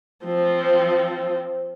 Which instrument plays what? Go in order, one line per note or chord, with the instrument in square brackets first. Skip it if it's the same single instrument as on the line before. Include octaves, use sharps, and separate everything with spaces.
[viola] F3 C4